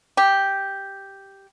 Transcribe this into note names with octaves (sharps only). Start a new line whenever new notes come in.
G4